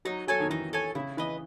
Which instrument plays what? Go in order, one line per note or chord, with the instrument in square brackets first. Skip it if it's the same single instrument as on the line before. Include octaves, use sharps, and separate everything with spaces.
[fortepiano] F#3 [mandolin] D#4
[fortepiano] F#3 [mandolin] A4 C#5 G#5
[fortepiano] D#3
[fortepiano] E3 [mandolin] D#4
[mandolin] A4 C#5 G#5
[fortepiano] C#3 [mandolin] E4
[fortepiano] E3 [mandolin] B4 D#5